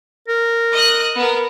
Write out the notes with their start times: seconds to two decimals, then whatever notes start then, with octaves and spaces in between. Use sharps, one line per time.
0.28 A#4
0.72 D#5 F#6
1.16 B3 A#4